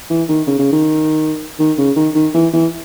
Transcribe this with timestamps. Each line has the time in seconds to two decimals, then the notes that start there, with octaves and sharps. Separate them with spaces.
0.10 E3
0.28 D#3
0.47 C#3
0.59 C#3
0.72 D#3
1.59 D#3
1.78 C#3
1.96 D#3
2.15 D#3
2.34 E3
2.53 E3